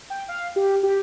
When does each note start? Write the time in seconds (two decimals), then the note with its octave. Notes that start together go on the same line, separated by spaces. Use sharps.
0.10 G5
0.29 F5
0.56 G4
0.83 G4